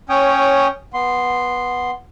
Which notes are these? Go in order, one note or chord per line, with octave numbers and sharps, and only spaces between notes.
C#4 C#5 G5 D#6
B3 C6